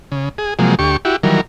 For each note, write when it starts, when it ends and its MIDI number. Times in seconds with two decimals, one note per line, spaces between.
0.12 0.29 49
0.38 0.54 68
0.59 0.75 48
0.59 0.75 53
0.59 0.75 54
0.59 0.75 56
0.59 0.75 58
0.79 0.97 38
0.79 0.97 67
0.79 0.97 85
1.05 1.16 64
1.05 1.16 66
1.05 1.16 67
1.23 1.41 51
1.23 1.41 52
1.23 1.41 54
1.23 1.41 55
1.23 1.41 70